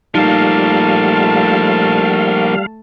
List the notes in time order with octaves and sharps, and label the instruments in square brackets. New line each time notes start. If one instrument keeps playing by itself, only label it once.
[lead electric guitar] F3 A#3 [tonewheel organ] G3 F5 [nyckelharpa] A3 A5 [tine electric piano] D#4